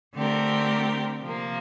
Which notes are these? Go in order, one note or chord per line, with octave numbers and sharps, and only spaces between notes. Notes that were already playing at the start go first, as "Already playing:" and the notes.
D3 A3 C4 G4 A#4
C3 F3 A#3